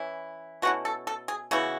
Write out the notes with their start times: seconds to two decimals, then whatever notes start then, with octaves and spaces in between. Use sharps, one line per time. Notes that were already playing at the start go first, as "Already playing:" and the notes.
Already playing: E3 C#4 E4
0.62 B2 A3 C#4 E4 F#4
0.85 A4
1.07 A4
1.28 G#4
1.51 C#3 E3 B3 E4 F#4